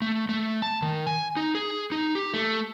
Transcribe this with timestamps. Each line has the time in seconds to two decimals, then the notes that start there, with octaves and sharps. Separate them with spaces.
0.02 A3
0.29 A3
0.62 A5
0.82 D#3
1.07 G#5
1.37 D#4
1.55 G#4
1.92 D#4
2.15 G4
2.34 A3